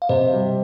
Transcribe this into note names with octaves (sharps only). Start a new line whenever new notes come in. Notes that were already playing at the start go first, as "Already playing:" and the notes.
F5
C3 C5 D#5
G3